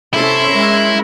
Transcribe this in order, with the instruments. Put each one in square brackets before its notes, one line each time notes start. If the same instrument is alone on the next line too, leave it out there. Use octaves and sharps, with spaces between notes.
[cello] C3 A4 [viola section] C#4 E5 C6 [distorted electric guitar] E4
[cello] G#3 A#4